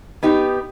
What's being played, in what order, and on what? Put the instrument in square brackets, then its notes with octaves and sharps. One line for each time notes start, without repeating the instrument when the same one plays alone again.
[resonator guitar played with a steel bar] B3 D#4 G4